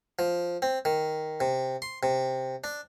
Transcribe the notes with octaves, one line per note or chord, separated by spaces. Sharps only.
F3
C4
D#3
C3
C6
C3
D4